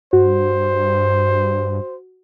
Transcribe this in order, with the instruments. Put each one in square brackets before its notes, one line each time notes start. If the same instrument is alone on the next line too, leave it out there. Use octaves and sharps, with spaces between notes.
[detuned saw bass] G2 [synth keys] F#4 [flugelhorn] C5